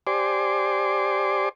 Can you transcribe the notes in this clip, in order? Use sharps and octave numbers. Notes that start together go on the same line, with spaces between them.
G4 C5 D5 G#5 C6 D6